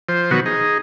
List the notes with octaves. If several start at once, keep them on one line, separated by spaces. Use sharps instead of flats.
F3 C5
B2 D#3 F#3 B3 F#4
D#4 G#4